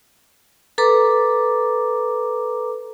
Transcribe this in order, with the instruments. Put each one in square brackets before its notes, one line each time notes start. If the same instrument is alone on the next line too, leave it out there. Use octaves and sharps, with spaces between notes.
[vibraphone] A4 B4 A#5 D6